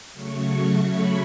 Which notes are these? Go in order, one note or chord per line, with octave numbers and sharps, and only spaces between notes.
C#3 F#3 A3 C#6
B5